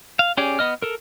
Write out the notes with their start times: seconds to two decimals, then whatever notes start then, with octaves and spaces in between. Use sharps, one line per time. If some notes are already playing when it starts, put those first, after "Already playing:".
0.19 F5
0.37 C#4 G4 G#4 D5
0.59 B3 D#5 F6
0.82 A4 A#4